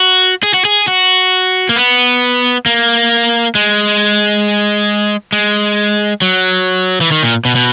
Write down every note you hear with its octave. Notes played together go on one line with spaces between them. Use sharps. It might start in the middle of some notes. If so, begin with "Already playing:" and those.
Already playing: F#4
G#4
F#4
G#4
F#4
A#3
B3
A#3
G#3
G#3
F#3
E3
D#3
A#2
B2
B2